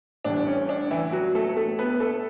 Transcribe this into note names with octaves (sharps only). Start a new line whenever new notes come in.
A1 A2 E3 G3 D4
C#4
D4
E3 E4
F#3 F#4
A3 A4
A3 A4
B3 B4
B4
A3 A4